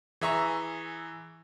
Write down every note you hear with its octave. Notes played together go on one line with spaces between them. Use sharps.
E3 G#4 E5 A#5 C#6